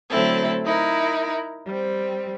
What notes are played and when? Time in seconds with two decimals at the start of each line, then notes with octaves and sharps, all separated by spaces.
0.10 D3 F#3 A3 C4 E4 A4
0.65 D#4 E4 A#4
1.67 G3 C4